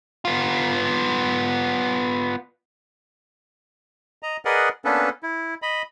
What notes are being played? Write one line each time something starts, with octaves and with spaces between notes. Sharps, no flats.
B3 F4
D#5 A#5
G#4 A#4 B4 D5 D#5 F#5
A#3 B3 C#4 D4 A4 B4
E4
D#5 B5